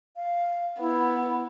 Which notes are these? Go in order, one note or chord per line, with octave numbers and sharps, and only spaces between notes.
F5
B3 E4